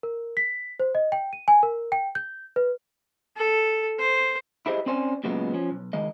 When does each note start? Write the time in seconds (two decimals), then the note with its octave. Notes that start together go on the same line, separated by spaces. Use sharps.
0.03 A#4
0.37 B6
0.80 C5
0.95 D#5
1.12 G5
1.33 D#7
1.48 G#5
1.63 A#4
1.92 G5
2.15 G6
2.56 B4
3.37 A4
3.99 C5
4.66 E4 G4 G#4 C5 D#5
4.86 C4 C#4 C5 D5 G#5
5.24 A#2 C#3 F#3 G#3 B3
5.54 F3 C#4
5.71 B1
5.93 C#2 D#3 G#3 D#5